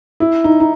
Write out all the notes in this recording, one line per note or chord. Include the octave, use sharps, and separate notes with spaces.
E4
D#4
D#4